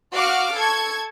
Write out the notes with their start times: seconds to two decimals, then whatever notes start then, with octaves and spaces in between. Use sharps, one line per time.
0.13 F#4 F5 C#6 D6 F6
0.55 A4 C#6 G#6